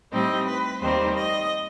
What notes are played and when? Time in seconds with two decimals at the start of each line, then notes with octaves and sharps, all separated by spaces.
0.13 A2 G3 C4 D#4 D#5
0.47 B4
0.82 D#2 D#3 G3 C4 C5
1.16 D#5